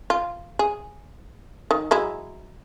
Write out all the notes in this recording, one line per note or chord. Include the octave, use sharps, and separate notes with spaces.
F4
G#4
D#3
F#3 G#3 E4